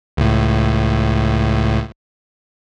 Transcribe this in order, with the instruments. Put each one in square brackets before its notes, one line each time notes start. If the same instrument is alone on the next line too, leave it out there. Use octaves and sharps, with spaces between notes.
[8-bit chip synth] C#2 A2